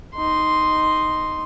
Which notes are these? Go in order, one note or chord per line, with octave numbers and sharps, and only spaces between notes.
D#4 C6